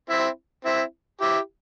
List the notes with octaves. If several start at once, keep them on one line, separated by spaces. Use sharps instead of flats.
C4 E4
C4 E4
E4 G4